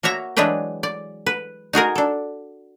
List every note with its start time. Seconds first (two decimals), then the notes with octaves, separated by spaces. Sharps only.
0.03 A#3 F#4 C#5 E5 A#5
0.37 E3 F#3 G#3 D4 B4 G5
0.83 D5
1.26 B4
1.73 D#4 F#4 G#4 A#4
1.95 D4 A4